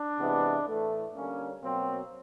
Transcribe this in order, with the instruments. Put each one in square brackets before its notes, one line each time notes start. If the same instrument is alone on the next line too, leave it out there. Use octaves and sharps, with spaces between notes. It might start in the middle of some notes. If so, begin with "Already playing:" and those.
Already playing: [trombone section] D4
C3 E3 G#3 B3
A2 E3 A3
D3 G3 A#3 C#4
B2 F#3 A#3 C4